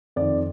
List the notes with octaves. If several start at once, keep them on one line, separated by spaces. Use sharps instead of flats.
F2 D#3 D5